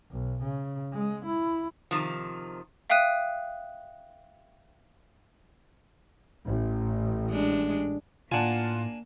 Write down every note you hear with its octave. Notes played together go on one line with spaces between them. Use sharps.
B1
C#3
G#3
E4
C3 D#3 F3
E5 F5 G5 D#6 F#6 D#7
A1
G#3 D4
A2 A#3 D4 F4 F#5 G#5 A5